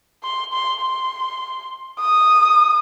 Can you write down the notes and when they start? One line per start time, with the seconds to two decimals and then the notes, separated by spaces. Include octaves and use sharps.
0.24 C6
0.53 C6
0.81 C6
1.99 D#6